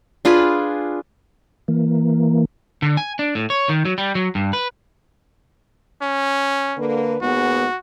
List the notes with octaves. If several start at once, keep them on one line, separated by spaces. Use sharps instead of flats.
D4 F4 G#4 B4
E3 A#3
D3
G#5
D4
A2
C#5
D#3
F#3
G3
F#3
G2
B4
C#4
D3 A#3 B4
D#2 G#3 B3 F#4